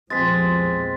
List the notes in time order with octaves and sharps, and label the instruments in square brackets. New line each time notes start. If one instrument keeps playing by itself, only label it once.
[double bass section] A#1 E2 F3 [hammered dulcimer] G#3 C4 [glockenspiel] A6 B6